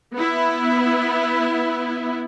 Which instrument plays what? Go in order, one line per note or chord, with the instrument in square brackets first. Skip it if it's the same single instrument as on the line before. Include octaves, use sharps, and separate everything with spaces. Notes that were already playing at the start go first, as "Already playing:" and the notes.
[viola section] B3 E4